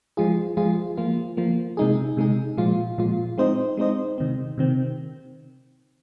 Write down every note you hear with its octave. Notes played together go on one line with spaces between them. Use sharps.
F3 G#3 F4 G#4
F3 G#3 F4 G#4
F3 A#3 F4
F3 A#3 F4
C3 G#3 D#4 G#4
C3 G#3 D#4 G#4
A#2 F3 G#3 F4
A#2 F3 G#3 F4
G#3 C4 D#4 C5 D#5
G#3 C4 D#4 C5 D#5
C3 D#3 C4
C3 D#3 C4